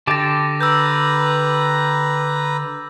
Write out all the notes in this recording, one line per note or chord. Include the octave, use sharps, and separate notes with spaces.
D3 G4 A5 D6 A6 A#6
B4 A#5 E6 G6